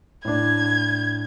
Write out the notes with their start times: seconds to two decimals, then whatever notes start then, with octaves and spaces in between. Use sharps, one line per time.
0.25 A2 D4 G#6